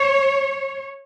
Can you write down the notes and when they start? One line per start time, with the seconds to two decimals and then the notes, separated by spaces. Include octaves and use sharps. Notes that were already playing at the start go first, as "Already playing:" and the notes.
Already playing: C#5